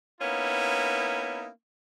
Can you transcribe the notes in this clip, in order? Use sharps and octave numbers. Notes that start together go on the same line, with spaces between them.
A#3 B3 C#4 D#4 E4